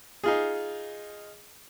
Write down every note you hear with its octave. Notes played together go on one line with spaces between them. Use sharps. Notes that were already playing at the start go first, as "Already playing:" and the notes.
D#4 F4 G#4